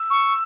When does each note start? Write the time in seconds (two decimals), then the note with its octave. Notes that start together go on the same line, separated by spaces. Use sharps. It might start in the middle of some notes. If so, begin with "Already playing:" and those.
Already playing: E6
0.10 C#6